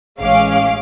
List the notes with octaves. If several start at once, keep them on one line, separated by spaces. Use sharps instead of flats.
A1 G#3 C#4 F5 D6